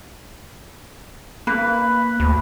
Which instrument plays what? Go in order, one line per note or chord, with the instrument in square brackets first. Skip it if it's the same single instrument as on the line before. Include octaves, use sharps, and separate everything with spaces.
[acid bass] A#3 [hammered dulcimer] B4
[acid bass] D2